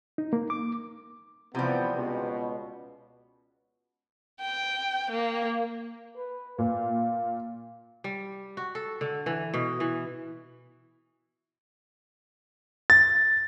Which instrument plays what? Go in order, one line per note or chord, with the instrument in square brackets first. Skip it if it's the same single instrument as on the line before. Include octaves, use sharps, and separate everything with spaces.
[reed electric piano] D#4
A#3
D6
[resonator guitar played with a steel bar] C3 G3 [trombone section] E3 F3 B3
[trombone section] C#2 B2
[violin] G5
A#3
[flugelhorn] B4
[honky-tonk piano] A#2 [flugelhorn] F5
[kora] G3
F#4
A4
D3
E3
B2
E3
[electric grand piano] A6